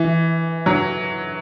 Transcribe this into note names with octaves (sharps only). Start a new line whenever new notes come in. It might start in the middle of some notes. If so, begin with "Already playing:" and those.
Already playing: E3
F#3